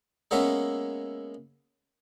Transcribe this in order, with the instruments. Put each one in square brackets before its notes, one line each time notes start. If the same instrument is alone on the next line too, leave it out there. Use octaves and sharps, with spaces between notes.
[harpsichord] G#3 A#3 B3 C#4 E5